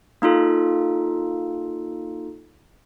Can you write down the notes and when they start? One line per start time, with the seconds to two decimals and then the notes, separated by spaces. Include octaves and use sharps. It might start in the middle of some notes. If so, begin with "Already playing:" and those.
0.22 A#3 D#4 F4 A4